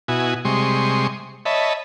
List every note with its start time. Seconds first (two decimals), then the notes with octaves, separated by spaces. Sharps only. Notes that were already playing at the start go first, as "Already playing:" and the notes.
0.08 B2 E4 F#4 G#5 D#6
0.45 C3 G3 G#3 C6 C#6 D#6
1.45 C#5 D#5 E5 A5 B5